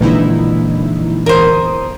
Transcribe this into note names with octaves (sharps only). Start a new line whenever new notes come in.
A#1 A#2 D3 E3 G#3 D#4 E4
E2 A#4 C5 D#6